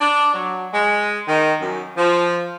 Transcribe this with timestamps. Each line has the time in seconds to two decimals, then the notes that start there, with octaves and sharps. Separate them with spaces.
0.01 D4
0.34 F#3
0.73 G#3
1.28 D#3
1.61 F#2
1.97 F3